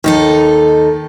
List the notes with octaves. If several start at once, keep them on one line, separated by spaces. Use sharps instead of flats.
D#2 D#3 D#4 A4